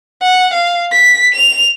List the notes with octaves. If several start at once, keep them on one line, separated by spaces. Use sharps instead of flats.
F#5
F5
B6
F7